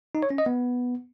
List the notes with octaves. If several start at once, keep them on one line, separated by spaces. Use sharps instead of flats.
D#4
C#5
C#4
D#5
B3